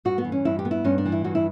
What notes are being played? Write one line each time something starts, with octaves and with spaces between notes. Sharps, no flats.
G2 F#4
B3
E3
C#4
G2 E4
G4
B3
E4
G2 C#4
D4
E3
E4
G2 F#4
E4